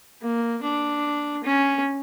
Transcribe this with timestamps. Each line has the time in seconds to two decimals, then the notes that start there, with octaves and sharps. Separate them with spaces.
0.21 A#3
0.62 D4
1.43 C#4